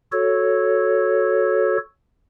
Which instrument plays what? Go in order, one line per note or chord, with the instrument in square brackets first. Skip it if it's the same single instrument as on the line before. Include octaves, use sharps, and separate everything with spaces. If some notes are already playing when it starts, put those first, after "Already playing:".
[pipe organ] F#4 A4 C#5